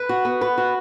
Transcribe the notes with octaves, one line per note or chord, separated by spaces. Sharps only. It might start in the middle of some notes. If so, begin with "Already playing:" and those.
Already playing: B4
F#4
B3
B4
F#4